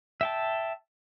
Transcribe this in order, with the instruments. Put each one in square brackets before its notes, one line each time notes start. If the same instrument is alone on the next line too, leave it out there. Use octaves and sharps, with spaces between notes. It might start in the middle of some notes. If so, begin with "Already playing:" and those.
[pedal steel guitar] E5 G5 A5